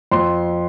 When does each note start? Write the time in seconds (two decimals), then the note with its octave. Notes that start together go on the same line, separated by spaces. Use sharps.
0.12 F2 C6